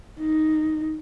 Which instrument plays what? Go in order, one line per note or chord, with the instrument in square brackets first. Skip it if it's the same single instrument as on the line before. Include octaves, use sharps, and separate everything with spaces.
[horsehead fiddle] D#4